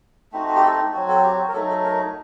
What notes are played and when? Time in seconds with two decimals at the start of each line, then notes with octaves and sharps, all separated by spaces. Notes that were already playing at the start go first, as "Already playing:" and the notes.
0.32 A3 C4 D#4 F#4
0.48 F#4
0.55 G4
0.62 A4
0.93 F#3 C4 F#4
1.09 A4
1.23 G4
1.48 A#4
1.53 F#3 A3 D#4 A4
1.69 A4
1.84 A#4